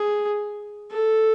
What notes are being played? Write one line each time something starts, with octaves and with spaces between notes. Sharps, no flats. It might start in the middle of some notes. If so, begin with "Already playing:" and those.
Already playing: G#4
A4